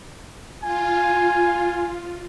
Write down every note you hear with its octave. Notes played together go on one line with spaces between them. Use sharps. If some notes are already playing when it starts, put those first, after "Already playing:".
F4 G#5